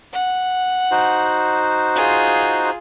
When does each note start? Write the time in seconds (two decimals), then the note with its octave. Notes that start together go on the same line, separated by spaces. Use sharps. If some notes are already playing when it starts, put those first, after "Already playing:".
0.13 F#5
0.91 D#4 F#4 C5
1.95 F4 G#4